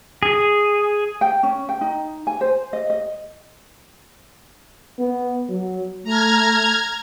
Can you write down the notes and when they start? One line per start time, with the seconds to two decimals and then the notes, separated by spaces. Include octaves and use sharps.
0.23 G#4
1.21 G5
1.43 C#4
1.69 G5
1.81 D#4
2.27 G#5
2.41 C5
2.73 D#5
2.90 D#5
4.99 B3
5.49 F#3
6.04 A3 A#5 F6 G#6